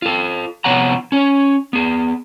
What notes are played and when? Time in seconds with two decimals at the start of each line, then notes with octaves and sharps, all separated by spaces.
0.02 F4 A4
0.64 C3 F3 B3 C#5 F#5 A#5
1.12 C#4 C#5
1.73 B3 G#4